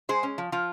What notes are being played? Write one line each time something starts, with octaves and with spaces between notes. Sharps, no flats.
G#3 G#4 C5
C#4
F3
F3 F4